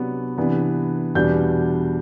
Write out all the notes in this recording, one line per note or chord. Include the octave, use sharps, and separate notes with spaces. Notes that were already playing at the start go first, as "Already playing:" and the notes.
Already playing: C3 F#3 B3 D4
C3 E3 B3 D4
E2 B2 G3 D4 G6